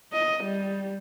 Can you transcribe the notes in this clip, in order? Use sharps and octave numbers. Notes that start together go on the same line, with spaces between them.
D#5
G3